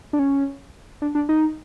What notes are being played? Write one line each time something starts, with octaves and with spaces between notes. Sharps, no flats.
D4
C#4
D4
D4
D#4